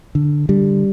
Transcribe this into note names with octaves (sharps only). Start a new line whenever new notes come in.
D3
D3 G3